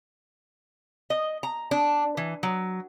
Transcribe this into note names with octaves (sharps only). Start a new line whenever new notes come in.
D#5
A#5
D4
E3
F#3